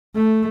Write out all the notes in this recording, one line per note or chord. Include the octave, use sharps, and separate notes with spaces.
A3